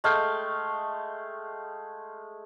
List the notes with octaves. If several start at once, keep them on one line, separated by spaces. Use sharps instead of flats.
G#3 A3 F5 G5